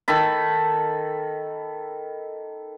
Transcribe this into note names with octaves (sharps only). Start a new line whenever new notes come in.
D#3 A4 B5